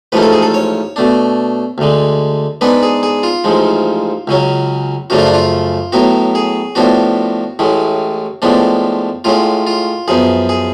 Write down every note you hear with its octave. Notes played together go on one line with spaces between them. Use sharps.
A1 G#2 F3 A3 C#4 B4
A4
G#4
A4
C#5
B2 A3 D4
D2 D3 G#3
G#2 G#3 B3 D4 B4
G#4
G#4
F4
A1 G#2 F3 G#3
C#2 C#3 F#3 C#4
F#2 C#3 F3 A3 D4 F#4
F4
D4
F4
A2 F#3 B3 F#4
G#4
A2 F3 B3 D4 F#4
A1 A2 G#3 C#4
A2 F3 G#3 B3 D4
A2 G#3 C#4 F4
F4
F#2 F3 B3 G#4
G#4